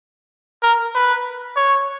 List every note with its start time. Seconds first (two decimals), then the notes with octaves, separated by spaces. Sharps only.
0.63 A#4
0.95 B4
1.56 C#5